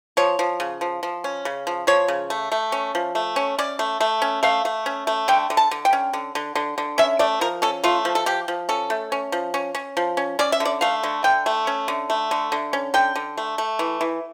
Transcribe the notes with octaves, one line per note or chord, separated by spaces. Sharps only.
F3 C#5
F3
C#3
F3
F3
C#4
C#3
F3
F3 C#5
C#3
A3
A3
C#4
F3
A3
C#4
C#4 D5
A3
A3
C#4
A3 F5
A3
C#4
A3
D3 G5
D3
A5
D3
G5
C#4
D3
D3
D3
D3
C#4 E5
A3 D5
F3 A#4
C#4 A4
A3 F4
F3
A4
F3 G4
F3
C#4 A4
A3
C#4
F3
C#4
C#4
F3
C#4
C#4 D5
E5
D3
D5
A3 F5
D3
D3 G5
A3
C#4
D3
A3
D3
D3
C#4
D3 G5
D3
A3
A3
E3
E3